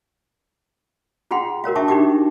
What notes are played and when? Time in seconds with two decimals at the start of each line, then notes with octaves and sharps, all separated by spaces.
1.31 F4 G#4 F#5 G5 C6
1.64 F#4 A#4 C#5 F5
1.75 D4 E5 G5 A5 C#6 D6
1.88 D4 D#4 F#4 G4 G5 D6